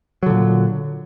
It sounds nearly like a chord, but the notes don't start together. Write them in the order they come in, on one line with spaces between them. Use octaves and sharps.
F#3 D3 A#2